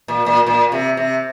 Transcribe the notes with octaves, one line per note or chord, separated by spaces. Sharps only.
A#2
A#2
A#2
C3
C3